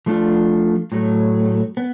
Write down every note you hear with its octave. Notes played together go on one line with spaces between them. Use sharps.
F3 A3 D4 F4
A2 F#3 A3
B3